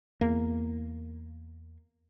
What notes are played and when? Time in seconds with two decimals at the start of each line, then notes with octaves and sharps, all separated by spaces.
0.21 E2 A#3